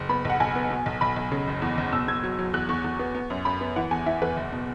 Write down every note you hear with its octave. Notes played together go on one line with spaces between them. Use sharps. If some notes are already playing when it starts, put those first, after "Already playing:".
Already playing: F#1
B3 B5
B1 F#5
B1 G#5
B3
B2
B1
B1 B5
B1
C#3
F#1
E2
F#1
B2 E6
B2 G#6
F#3
F#3
E2 F#6
E2 C#6
E2
B3
B3
F#2
F#2 B5
B3
E3 F#5
E2 G#5
E3 E5
E2 B4
F#1
B2